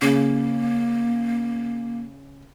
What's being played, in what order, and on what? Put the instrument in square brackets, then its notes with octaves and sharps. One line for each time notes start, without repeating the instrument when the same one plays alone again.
[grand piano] C#3 [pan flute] A#3